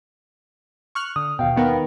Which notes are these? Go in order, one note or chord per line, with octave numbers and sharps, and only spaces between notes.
C#6 F6 F#6
D3 D#6
D#2 B2 F5 G5
D#3 B3 A#4